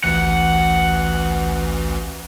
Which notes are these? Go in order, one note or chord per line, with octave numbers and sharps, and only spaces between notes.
A1 D2 E3 F#5